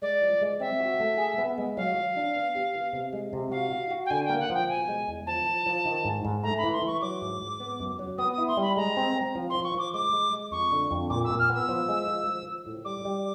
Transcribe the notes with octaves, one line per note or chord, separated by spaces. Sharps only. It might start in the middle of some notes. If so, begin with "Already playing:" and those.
G#3 D5
F3
G#3
C4 E5
F#4
A3
G#4
B3
G#3
F#3 F5
F#3
D4
B3
G4
B3
C3
G#3
C3
F#4 F5
F#4
F#4
G5
D3 G#5
A#3 G5
F#5
F3 G5
B2 G#5
G#3
E2
F3 A5
F3
F3
D#3
G#2
G#2
A3 A#5
B5
E3
C6
E3 C#6
F#3 D6
G#2
G#2
B3
F#2
F#3
B3 D#6
D#6
E4
C6
G3
B5
G#3 A#5
C4
C4
F3
F3 C6
C#6
F3 D6
G#3 D6
G#3
G#3
F2 C#6
D3
F2
A#2 D6
E6
A#2
F6
B3 E6
F3
G#3
F3
F3
F3
A2
G3 D6
G3